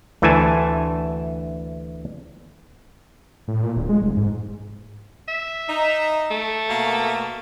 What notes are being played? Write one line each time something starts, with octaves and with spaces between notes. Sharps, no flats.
D2 E3 A3 E5 G#5 A5
A2
A#2
D1
G#3
F1
G#2
E5
D#4
A3
B2 A#3